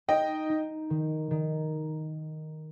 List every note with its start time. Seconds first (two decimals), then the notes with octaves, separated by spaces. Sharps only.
0.08 D#4 D#5 G5
0.49 D#4
0.90 D#3
1.31 D#3